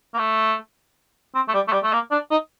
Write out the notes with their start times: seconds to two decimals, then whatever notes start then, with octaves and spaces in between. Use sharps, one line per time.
0.14 A#3
0.18 A3
1.35 C4
1.48 A3
1.54 G3
1.68 A3
1.73 G3
1.84 A3
1.93 A#3
2.11 D4
2.31 D#4